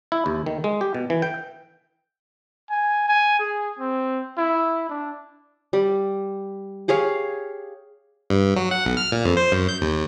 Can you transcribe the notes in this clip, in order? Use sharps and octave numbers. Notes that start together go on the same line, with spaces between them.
E4
D#2
D#3
G#3
G4
B2
E3
G5
G#5
G#5
G#4
C4
E4
D4
G3
G4 G#4 C#5 F5
G2
F#3
F#5
B1
F6
A#2
F2
C5
F#2
G6
D#2